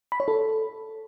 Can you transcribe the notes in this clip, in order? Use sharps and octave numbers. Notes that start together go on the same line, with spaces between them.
B5
C#5
A4